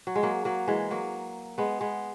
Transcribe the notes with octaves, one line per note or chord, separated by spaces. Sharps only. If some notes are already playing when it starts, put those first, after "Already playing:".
F#3
G#3
F#3 A#3
F#3 A#3
E3 G#3
F#3 A#3
G#3 B3
G#3 B3